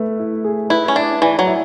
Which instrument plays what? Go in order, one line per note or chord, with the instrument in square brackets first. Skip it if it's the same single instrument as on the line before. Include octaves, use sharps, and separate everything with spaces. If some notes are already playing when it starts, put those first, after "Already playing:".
Already playing: [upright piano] A3 B4
E4
G#4
[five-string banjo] E4 [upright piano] B4
[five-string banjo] C#4
[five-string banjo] D4 [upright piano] E4
[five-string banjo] E3 [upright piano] D5
[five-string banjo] F#3
[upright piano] E4